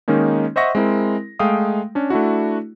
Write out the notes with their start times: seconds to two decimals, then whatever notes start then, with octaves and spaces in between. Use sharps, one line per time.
0.08 D#3 G#3 A#3 C#4 D#4
0.56 C5 D#5 E5 F#5 C#6 A#6
0.75 G#3 C4 E4 A#4
1.39 G#3 A3 F5 G5 D#6
1.95 C#4 D4
2.10 A3 D4 E4 F#4